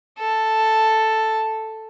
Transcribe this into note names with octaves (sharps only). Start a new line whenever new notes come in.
A4